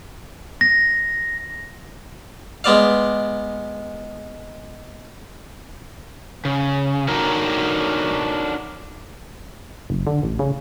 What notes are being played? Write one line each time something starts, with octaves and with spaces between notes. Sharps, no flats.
A#6
G#3 B3 D5 F5
C#3
D4 D#4 F#4 A4 A#4 C#5
F#1
D3
A1
C#3